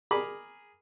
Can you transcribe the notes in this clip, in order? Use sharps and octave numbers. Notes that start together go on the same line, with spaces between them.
G#4 A#4 A#5 B5 D6